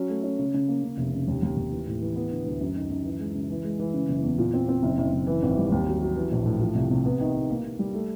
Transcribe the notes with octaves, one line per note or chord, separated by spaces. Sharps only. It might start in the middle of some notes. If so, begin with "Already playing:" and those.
Already playing: F#3 C#4
A3
C#4
C#3
C#3
A#3
C#3
F1
C#3
D#2
D#2
D#2
E3
A2
E3
B3
D3
D2
F#2
D#3
F#2
E3
G#3
C#3
E3
G#3
E3
C#3
F#1
E2
A#2
C4
C4
F#1
F#1
F#1
E3
G#1
G3
D#2
F#3
F#3
E3
A#1
A2
F3
C2
C3
B3
D#3
B3
A#3
A#3
G3
A3